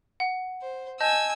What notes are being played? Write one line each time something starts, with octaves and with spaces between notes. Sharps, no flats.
F#5
C5
D#5 G#5 A5 E6 G6